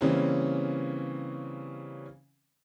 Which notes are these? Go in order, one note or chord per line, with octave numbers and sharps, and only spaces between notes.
C#3 E3 G3 A#3 C4 C#4